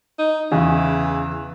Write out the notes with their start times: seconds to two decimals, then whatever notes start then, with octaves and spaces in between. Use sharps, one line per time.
0.19 D#4
0.52 E2 C#3 E3